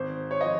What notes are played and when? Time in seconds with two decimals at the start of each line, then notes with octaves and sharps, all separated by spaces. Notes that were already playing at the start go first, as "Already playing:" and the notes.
Already playing: G#1 C5
0.31 C#5
0.41 F3 D#5